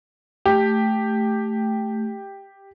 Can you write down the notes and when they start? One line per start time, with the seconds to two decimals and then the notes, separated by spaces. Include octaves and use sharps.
0.45 A3 G4